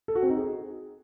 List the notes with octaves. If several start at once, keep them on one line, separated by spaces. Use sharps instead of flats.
A4
F#4
C4
D#4
G#4